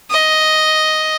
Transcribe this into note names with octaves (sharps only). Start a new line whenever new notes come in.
D#5